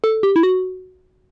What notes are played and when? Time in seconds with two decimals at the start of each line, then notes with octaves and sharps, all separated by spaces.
0.04 A4
0.23 G4
0.36 E4
0.43 F#4